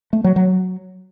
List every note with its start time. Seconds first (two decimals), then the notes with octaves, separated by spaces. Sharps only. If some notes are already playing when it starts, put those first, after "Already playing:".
0.13 A3
0.24 F#3
0.36 F#3